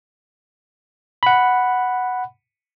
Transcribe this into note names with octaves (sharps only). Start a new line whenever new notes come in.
F#5 B5